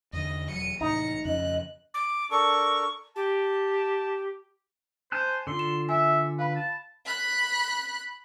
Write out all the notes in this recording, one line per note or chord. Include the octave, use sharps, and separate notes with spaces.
E2 D3 D#5
E1 F#3 C#7 D#7
C2 A2 E3 D#4 A#5 C#7
F2 C#3 D#5 F#6
D6
D4 A4 A#4 C#6
G4 A5
C5 G#5 A5 F#6
D3 F4 C6
E7
E5 G#5
B4 F5 B5
A5
B5 F#6